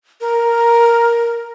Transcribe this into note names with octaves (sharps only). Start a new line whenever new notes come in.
A#4